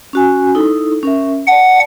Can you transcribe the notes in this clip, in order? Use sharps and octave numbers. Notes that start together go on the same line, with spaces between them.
C#4 F#4 G#5
D#4 E4 A4
C#4 A#4 E5
D5 F#5 A5